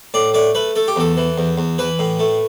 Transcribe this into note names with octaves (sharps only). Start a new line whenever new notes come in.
A2 D5
A3 D5
A3 B4
A3 A4
G4
E2 A4
E3
E2
E2
E3 B4
A2
A3